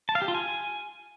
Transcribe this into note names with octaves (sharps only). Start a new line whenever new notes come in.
A5
F5
G4
F4
G#5